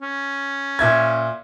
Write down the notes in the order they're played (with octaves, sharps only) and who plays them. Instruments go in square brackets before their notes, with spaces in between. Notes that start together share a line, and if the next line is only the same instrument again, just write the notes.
[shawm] C#4
[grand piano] A#2 E5 G#6